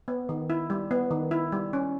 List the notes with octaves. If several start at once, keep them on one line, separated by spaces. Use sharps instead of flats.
B3
D#3
E4
G3
B3
D#3
E4
G3
C#4